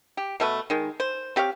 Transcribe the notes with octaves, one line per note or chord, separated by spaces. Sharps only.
G4
B2 A3 B4
D#3 G#3
C5
C4 G4 C#5 F5